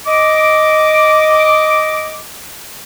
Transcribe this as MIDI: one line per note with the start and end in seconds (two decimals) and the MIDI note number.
0.06 2.18 75
0.06 2.18 86